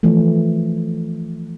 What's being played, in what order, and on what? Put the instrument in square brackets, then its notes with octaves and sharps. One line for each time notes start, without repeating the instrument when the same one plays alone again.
[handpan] E3 F3 A3